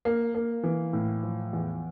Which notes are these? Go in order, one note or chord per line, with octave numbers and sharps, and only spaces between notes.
A#3
A#3
E3
A2
F3
E2